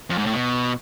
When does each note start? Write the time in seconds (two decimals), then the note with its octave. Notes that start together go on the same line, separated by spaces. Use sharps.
0.10 F2
0.18 G#2
0.26 A2
0.34 B2